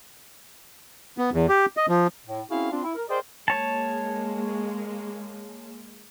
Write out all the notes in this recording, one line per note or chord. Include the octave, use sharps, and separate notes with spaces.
B3
E2
G4
D#5
F3
A2
C4 C#4 E4 F#4 G#4 F5
C4 D4 F4
E4
A#4
G#4 A#4 C5 D5 D#5 G5
G#3 A#3 C#5 A5